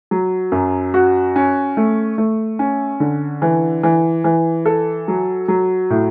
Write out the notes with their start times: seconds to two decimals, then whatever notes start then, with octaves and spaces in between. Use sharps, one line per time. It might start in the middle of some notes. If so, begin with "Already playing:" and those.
0.11 F#3
0.52 F#2
0.94 F#4
1.36 C#4
1.77 A3
2.18 A3
2.59 C#4
3.00 D3
3.42 E3
3.83 E3
4.24 E3
4.66 A4
5.08 F#3
5.48 F#3
5.90 A2